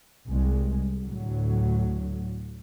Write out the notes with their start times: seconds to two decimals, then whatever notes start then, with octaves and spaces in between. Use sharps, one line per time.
0.28 C2 G#3
1.02 D2 A2 F#3